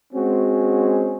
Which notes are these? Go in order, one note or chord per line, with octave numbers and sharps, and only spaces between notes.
G#3 C4 C#4 F#4